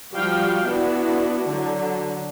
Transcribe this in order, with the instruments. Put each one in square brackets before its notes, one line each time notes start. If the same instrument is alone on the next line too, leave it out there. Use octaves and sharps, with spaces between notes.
[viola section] F3 G3 F#4 F5 G5
B3 D4 E4 F#4
D3 F#3